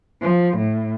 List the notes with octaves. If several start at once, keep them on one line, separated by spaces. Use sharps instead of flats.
F3
A2